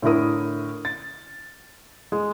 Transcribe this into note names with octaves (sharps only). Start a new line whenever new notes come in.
A2 D3 E4 A#4 D#6
A6
G#3